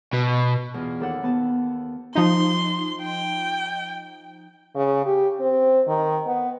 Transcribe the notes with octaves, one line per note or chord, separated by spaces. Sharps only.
B2
E2 F4
D#2 A4 F#5
D#2 B3 A5
F3 D#4 C6
G5
C#3
G4
C4
D#3
B3